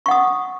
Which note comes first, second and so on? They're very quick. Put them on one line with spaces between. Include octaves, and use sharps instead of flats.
C#6 F#5 D#6